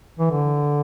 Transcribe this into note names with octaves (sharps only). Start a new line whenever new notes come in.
E3
D3